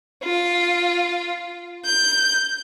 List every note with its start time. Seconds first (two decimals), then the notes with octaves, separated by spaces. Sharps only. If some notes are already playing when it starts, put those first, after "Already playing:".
0.24 F4
1.85 G6